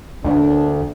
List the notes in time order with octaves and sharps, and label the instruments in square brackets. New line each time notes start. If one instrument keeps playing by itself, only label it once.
[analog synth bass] D2 [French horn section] A#3 C#4 D4